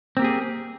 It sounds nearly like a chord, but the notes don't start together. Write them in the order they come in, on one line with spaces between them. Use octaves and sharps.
C4 A#3 G4 G#4